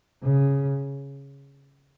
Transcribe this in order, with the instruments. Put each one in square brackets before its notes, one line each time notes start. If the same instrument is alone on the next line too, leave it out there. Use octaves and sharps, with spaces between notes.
[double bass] C#3